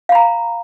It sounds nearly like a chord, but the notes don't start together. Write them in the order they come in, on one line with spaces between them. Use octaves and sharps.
F5 B5 A#5